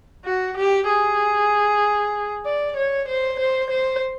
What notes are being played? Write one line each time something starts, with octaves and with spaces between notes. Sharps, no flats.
F#4
G4
G#4
D5
C#5
C5
C5
C5